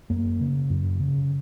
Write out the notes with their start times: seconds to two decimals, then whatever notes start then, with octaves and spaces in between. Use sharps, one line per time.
0.10 F#2 A#3
0.41 C#3
0.70 F#2
1.00 C#3